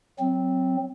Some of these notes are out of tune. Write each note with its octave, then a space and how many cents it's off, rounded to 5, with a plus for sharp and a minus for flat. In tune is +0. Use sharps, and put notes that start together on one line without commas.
F#3 +0 C4 +0